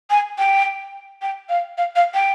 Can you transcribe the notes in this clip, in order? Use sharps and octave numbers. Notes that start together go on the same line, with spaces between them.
G#5
G5
G5
F5
F5
F5
G5